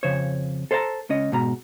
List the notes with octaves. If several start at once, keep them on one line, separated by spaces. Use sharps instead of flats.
F2 C#3 C5 C#5
A4 C5 C#5 F5 A5 A#5
C#2 C#4 D#5
G#2 B2 A#5